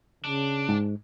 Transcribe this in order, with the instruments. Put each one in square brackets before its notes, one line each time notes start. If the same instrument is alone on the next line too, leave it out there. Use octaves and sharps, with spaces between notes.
[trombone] C#3 [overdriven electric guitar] D4
[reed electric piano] G#2